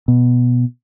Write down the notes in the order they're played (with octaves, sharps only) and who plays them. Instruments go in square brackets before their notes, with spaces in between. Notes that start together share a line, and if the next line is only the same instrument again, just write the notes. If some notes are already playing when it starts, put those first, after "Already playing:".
[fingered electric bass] B2